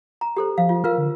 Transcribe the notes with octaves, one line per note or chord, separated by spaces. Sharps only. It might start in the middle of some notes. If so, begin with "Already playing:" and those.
A#5
G4 A4 C5
F3 F5
F4
F4 A#4 F5 F6
D3